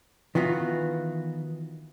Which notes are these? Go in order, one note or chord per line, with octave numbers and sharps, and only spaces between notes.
D#3 E3 B3 F4 F#4